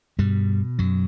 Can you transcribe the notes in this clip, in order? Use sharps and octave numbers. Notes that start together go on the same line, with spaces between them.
G2 B2 G3
F#2 F#3